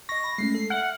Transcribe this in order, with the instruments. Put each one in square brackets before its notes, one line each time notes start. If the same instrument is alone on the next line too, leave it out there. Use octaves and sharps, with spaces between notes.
[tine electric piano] D#5 C#6 [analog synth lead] A#6
[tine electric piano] B5
[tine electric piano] G#3 A3 C#4 [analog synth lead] C7
[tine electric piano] A4
[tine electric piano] E5 F6 [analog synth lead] F#5